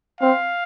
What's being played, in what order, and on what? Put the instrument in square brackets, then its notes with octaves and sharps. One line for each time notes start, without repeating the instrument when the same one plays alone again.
[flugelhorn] C4 [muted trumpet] F5